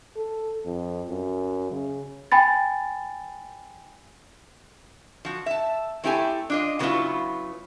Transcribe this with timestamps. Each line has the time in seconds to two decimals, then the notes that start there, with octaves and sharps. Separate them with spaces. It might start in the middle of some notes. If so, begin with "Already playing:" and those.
0.16 A4
0.65 F2
1.09 F#2
1.71 C#3
2.32 G5 G#5 B5 A6
5.25 F3 F#4
5.46 E5 A5
6.04 A3 C4 E4 G4 A4 G#5
6.50 D4 F4 D#5
6.79 C#3 E3 F#3 B3 E4 F4